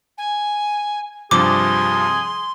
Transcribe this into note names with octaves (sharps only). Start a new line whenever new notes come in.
G#5
G2 C3 F3 G#4 C6 D6